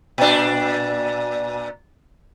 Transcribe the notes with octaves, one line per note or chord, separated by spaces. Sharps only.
A#2 D4